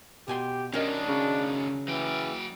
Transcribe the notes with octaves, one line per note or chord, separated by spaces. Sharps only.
B2 G4 G#5 C6
F#2 D#3 C#4 D4 A#4 D#5
C#3
E3 F#3 G5